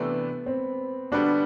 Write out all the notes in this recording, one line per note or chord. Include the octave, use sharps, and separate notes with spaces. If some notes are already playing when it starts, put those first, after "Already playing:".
Already playing: C3 E3 A3 B3 D4
C4
D3 G3 B3 D4 F#4